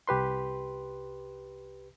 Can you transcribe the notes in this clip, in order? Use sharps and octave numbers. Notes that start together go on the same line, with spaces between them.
C2 G4 B4 C6